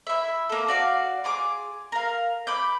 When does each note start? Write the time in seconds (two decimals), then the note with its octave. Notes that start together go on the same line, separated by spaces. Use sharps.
0.07 E4 E5
0.49 A#3 A4
0.68 F#4 D5 F5
1.24 F4 G#4 D6
1.92 A#4 F5
2.47 B5 D6 G6